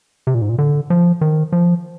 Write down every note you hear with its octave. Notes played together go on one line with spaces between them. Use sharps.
C3
A#2
G#2
A#2
D3
F3
D#3
F3